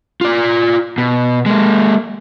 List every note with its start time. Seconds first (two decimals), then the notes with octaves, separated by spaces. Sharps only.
0.21 F4 D5
0.98 B2
1.46 G#3 A#3